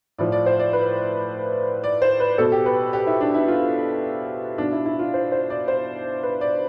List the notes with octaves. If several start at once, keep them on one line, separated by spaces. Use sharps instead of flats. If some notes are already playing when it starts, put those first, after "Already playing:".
A2 F3 D5
D5
C5
D5
B4
D5
C5
B4
B2 A4
G4
B4
G4
E4
D4
E4
F4
B2 D4
E4
E4
F4
C5
C5
D5
C5
B4
D5